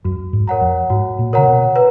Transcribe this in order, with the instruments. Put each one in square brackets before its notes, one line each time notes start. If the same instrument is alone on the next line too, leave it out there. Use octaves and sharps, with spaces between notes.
[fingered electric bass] F#2 [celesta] F#4
[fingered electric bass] G#2
[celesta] A#4 C#5 F#5 A#5
[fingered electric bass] F2
[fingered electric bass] G#2 [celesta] F#4
[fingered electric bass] A#2
[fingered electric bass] C#3 [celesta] A#4 C#5 F#5 A#5
[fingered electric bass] B2
[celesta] B4